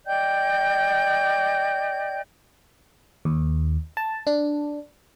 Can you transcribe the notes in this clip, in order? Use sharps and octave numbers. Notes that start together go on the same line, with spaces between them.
D5 D#5 G5 G6
D#2
A5
D4